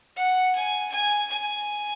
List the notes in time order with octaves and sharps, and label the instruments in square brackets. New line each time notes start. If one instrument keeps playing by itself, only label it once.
[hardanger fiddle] F#5
G#5
G#5
G#5